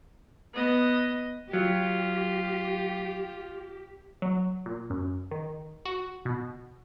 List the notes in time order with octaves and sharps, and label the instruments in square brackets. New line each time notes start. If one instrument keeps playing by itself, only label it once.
[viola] B3 D#5
[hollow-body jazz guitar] F#3 [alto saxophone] F4 [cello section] G4
[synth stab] F#3
A#2
F#2
D#3
F#4
B2